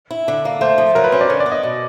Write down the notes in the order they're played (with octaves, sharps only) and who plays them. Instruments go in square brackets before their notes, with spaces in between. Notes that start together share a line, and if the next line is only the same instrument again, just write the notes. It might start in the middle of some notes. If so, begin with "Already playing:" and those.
[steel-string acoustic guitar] E4
D3
A#3
[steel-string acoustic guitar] A3 [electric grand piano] C5
[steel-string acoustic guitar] F3
[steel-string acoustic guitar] F#3 [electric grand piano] A#4
[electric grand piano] B4
[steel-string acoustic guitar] C#4 [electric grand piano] C5
[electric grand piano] D5
[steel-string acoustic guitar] D3 [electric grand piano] C#5
[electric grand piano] D5
[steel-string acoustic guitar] B3
[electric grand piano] D#5
[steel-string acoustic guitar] B2